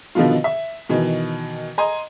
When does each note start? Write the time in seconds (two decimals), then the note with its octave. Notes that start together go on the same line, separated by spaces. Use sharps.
0.15 B2 D3 D#3 F3 B3 F4
0.44 E5
0.89 B2 D#3 E3
1.78 D#5 G#5 A#5 C6